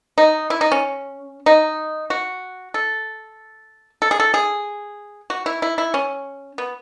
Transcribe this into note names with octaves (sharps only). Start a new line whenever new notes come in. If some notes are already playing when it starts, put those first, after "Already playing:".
D#4
E4
D#4
C#4
D#4
F#4
A4
A4
G#4
A4
G#4
F#4
E4
E4
E4
C#4
B3